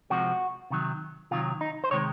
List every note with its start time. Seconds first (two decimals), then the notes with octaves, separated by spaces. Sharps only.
0.10 C3 F3 G#3 F#4
0.70 C3 D#3 F#3
1.31 C3 D#3 F#3 F4
1.61 D#4
1.84 C5
1.91 C3 D#3 G#3 C#5